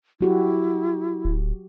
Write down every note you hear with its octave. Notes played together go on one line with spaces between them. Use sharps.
F#3 E4 F#4 G4
D1